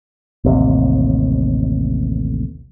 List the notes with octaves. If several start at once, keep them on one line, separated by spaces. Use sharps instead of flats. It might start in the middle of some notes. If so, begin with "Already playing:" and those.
A1 D#2 C3